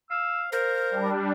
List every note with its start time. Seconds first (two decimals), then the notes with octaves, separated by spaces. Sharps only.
0.10 F5 E6
0.52 A#4 C5 F5
0.91 G3 D4